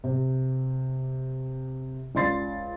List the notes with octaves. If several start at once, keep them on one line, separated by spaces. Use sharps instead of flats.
C3
C#2 D5 C6 A6 C7